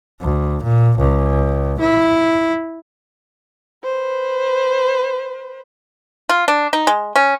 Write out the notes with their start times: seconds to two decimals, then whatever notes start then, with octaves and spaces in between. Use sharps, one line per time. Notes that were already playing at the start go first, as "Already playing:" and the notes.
0.21 D2
0.63 A#2
0.98 C#2
1.80 E4
3.84 B4 C5
6.29 F4
6.48 D4
6.73 D#4
6.87 G#3
7.16 C#4